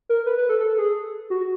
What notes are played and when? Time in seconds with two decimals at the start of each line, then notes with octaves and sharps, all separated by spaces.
0.09 A#4
0.26 B4
0.38 B4
0.49 A4
0.60 A4
0.78 G#4
1.30 F#4